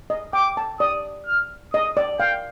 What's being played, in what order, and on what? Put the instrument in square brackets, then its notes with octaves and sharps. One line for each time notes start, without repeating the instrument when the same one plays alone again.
[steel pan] D#5
[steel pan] G5 [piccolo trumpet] D6
[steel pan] A5
[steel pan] D5 [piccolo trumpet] D#6
[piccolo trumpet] F6
[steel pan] D#5 [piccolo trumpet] D#6
[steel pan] D5
[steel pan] F5 [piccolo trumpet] G5